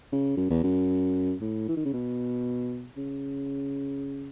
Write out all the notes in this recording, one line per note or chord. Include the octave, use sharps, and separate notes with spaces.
C#3
F#2
E2
F#2
A2
E3
D#3
C#3
B2
C#3